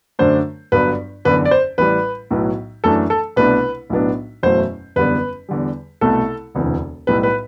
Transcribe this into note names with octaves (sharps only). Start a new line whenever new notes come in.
F#2 D3 A3 D4 C5
G1 G2 F#3 B3 B4
F#1 E2 D3 B4
D5
C5
A1 A2 G3 B4
B1 A2 F#3 B3
F#2 E3 A3 D4 A4
A4
C2 B2 A3 D4 B4
B1 A2 F#3 B3 D4
F#1 E2 B2 F#3 A3 C5
F#1 E2 D3 G3 B3 B4
E2 D3 G3
C2 B2 A3 A4
E1 D2 C3 E3
B1 A2 G3 B4
B4